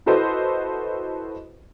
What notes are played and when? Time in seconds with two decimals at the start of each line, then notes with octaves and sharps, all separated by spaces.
0.06 E4 F#4 A4 B4 C5 D#5